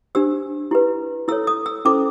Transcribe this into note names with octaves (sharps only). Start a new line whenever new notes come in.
D4 G4 C5 E6
E4 G4 B4
E4 A4 C#5 E6
D#6
E6
C#4 E4 A4 C5 D6